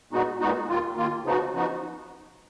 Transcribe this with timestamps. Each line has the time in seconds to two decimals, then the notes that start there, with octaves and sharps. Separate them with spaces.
0.12 A#2 G#3 B3 D#4 F#4
0.40 A#2 G#3 B3 D#4 F#4
0.68 D#2 D#3 A#3 F4
0.96 D#2 D#3 A#3 F4
1.24 C#3 F3 B3 D#4 F#4
1.52 C#3 F3 B3 D#4 F#4